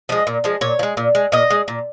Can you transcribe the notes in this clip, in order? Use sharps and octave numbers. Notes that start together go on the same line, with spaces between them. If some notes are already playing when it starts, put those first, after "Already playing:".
F3 G#3 D#5
A#2
F3 G#3
A#2 C#5
F3
G#3
A#2
G#3
A#2 D#5
G#3
A#2